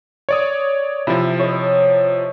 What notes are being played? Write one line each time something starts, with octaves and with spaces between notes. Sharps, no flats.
C#5 D5 D#6
C3 F3 E4
C#5 D#5